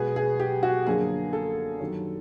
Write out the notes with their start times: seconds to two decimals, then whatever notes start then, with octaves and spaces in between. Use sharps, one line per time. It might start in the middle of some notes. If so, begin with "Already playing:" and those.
Already playing: B2 G#3 B3 G#4
0.16 G#4
0.40 G4
0.63 F#4
0.86 F#2 D3 F3 A#3 G#4
1.33 A4
1.80 F#2 D#3 G3